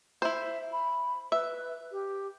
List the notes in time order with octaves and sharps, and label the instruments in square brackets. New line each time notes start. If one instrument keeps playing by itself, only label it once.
[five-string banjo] E4 C5 [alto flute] E5
[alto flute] B5
[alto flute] B4 [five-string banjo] E5
[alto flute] G4